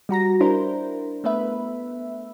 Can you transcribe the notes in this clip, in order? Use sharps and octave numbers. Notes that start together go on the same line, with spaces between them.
G3 F#4 A#5 A#6
D4 E4 A#4 C5
A3 B3 B4 E5